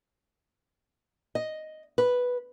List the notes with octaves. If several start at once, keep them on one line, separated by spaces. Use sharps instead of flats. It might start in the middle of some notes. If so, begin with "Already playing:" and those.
D#5
B4